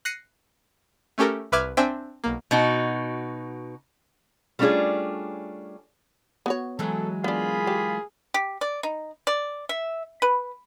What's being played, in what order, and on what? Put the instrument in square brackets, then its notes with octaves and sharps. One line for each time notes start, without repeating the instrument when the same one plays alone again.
[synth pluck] F#6 A#6 C7 C#7 D#7
A3 C#4 G4 A4 A#4
C2 B4 E5 D6 F6 G#6
C4 D4 C5 E5 G5 G#5
B1 A#3
[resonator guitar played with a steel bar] B2 D#4 F#4
G3 A3 C#4 D4 F4 G#4
[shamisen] B3 F#4 C#5
[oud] E3 F#3 G#3 [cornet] A4
[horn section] A#2 F4 B5 [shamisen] B3 D4 [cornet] G#4
[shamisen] G4
[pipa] G4
D5
D#4
D5
E5
B4